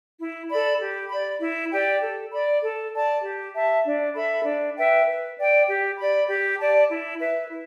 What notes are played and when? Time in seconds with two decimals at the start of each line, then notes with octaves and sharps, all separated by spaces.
0.19 E4
0.50 A4 D5 B5
0.80 G4
1.10 D5 B5
1.41 E4
1.71 G4 D5 G5
2.02 A4
2.32 D5 B5
2.63 A4
2.93 D5 A5
3.23 G4
3.54 E5 A5
3.85 D4
4.15 A4 E5 B5
4.46 D4
4.76 B4 E5 G5
5.07 B4
5.37 D5 G5
5.68 G4
5.98 D5 B5
6.29 G4
6.59 D5 A5
6.90 E4
7.20 B4 E5
7.50 E4